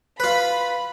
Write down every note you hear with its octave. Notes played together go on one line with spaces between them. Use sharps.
F4 B4 B5